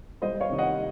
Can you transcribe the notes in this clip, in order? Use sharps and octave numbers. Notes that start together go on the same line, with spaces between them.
C2 C5 D#5
C#5 F5
C3 D#3
D#5 F#5